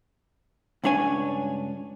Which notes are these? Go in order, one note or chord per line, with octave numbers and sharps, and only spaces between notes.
C#2 G2 D4 C#5 G#5